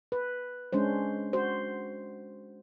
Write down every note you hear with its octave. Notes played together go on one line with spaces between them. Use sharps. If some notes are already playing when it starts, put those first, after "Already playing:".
B4
G#3 C#4 D4 C5
F#4 C5